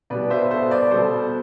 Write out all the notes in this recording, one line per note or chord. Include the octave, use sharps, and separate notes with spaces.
B2 G3 B4 D5
C5 E5
A4 C5
B4 D5
B2 G3 A4 C5